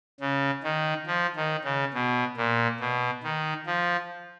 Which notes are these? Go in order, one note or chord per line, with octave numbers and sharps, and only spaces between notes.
C#3
D#3
F3
D#3
C#3
B2
A#2
B2
D#3
F3